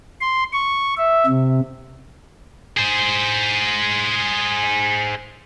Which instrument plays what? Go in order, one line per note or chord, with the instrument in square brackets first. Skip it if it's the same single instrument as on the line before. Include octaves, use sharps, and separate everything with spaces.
[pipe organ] C6
C#6
E5
C3
[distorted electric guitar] G#4 C5